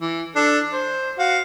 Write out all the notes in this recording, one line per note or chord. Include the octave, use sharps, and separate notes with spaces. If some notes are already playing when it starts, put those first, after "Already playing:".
E3
D4 A4
C5
F#4 F5